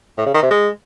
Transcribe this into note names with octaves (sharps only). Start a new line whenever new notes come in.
A2
C#3
D#3
C3
G#3